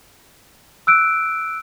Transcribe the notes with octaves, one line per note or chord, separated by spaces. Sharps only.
E6 F#6 D7